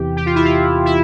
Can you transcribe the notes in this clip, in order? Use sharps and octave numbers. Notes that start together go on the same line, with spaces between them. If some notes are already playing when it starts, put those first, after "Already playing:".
Already playing: E2 C3 E3 G4
G4
F4
E4
F4
E4